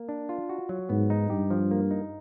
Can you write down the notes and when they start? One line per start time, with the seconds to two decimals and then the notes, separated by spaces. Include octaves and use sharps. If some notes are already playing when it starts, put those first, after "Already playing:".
Already playing: A#3
0.09 D4
0.29 F4
0.49 F#4
0.69 F#3
0.89 G#2 B3
1.10 D#4
1.30 G2 G4
1.50 F3
1.71 A#3
1.91 D#4